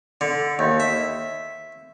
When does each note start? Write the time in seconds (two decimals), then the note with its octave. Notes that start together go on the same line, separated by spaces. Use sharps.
0.21 D3
0.59 D#2
0.80 E5